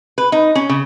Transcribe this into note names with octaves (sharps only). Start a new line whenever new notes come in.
B4
D#4
C#4
C#3